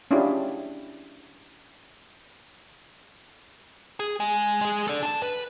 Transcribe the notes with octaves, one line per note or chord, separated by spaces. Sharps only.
C#4 D4 E4 F4 G4 G#4
G#4
G#3
G#3 G#4
A4 D5
D4 A5
B4